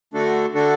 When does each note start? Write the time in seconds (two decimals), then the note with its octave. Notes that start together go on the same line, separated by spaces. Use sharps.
0.14 D3 A3 D4 F#4 A4
0.54 D3 A3 D4 F#4 A4